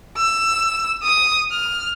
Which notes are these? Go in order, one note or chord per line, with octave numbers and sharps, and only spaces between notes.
E6
D#6
F6